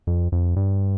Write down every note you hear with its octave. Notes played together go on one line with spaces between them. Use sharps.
F2
F2
G2